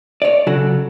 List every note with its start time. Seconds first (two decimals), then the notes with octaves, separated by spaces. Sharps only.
0.22 C#5 D5
0.47 C#3 F#3 F#4 A4